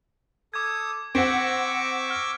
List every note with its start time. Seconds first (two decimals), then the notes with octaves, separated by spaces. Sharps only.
0.54 A4 D6 D#6 G#6
1.15 C4 F#5 C#6 D6 E6 A#6 B6 D7
2.11 F6